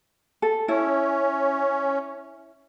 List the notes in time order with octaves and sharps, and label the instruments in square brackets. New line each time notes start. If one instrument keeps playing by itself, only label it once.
[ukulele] A4
[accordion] C#4 [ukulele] E4